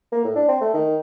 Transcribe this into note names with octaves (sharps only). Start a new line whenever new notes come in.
A#3
A2
D4
C4
A3
D#3